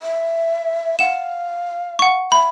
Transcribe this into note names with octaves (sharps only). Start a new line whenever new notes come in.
E5
F5 F#5 E7
F#5 C#6
E5 B5